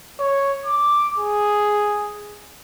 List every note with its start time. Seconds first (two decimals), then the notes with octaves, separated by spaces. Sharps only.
0.19 C#5
0.66 D6
1.18 G#4